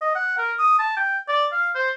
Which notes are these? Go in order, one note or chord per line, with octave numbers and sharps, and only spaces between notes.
D#5
F#5
A#4
D#6
A5
G5
D5
F5
C5